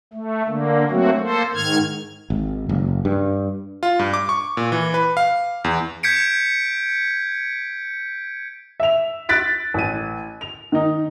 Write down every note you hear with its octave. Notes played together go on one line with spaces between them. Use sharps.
A3
D3 A#3
F#3 A3 A#3 C4 F#4
A#3 A4 C5
G#2 D#3 F6 G#6
G#1
F#1
G2
F4
G2
D6
C#6
A#2
E3
B4
F5
E2
G6 G#6 B6 C#7 D7
E5 F7
F#6 A6 B6 D7
A1 D#7
F7
D#3 D#4